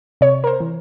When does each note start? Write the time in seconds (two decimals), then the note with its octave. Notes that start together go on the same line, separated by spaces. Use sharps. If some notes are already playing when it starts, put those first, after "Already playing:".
0.21 C3 C#5
0.44 A#4
0.47 C5
0.60 E3